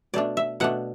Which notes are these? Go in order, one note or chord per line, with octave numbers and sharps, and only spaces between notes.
B2 A3 D4 D5
E5
B2 A3 D4 F#5